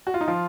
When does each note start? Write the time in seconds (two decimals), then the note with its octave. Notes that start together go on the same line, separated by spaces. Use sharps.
0.07 F#4
0.14 F4
0.21 D#4
0.28 F3 F4